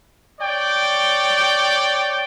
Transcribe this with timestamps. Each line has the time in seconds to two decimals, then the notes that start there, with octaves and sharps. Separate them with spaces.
0.39 C#5 D5 G5